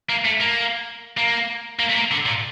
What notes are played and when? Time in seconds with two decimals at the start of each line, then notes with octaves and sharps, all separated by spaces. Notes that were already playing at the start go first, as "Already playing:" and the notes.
0.09 A#3
0.25 A3
0.40 A#3
1.18 A#3
1.79 A#3
1.89 A3
1.96 A#3
2.11 D3
2.26 A#2